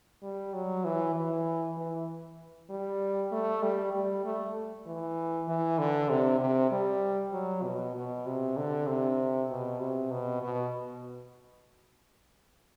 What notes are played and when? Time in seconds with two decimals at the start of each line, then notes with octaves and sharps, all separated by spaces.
0.23 G3
0.54 F#3
0.85 E3
1.15 E3
1.77 E3
2.70 G3
3.32 A3
3.63 G3
3.93 G3
4.25 A3
4.86 E3
5.48 E3
5.79 D3
6.10 C3
6.40 C3
6.72 G3
7.33 F#3
7.64 B2
7.95 B2
8.26 C3
8.57 D3
8.87 C3
9.50 B2
9.80 C3
10.11 B2
10.42 B2